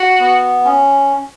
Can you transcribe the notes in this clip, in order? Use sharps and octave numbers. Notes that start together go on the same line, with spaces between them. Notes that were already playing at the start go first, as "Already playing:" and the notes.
Already playing: F#4
B3
C#4